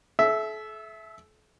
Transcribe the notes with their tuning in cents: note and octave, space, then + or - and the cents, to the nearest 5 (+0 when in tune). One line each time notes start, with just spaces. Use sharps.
A4 -40 E5 +0